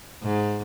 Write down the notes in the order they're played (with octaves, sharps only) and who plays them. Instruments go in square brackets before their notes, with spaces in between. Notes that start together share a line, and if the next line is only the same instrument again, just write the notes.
[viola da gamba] G#2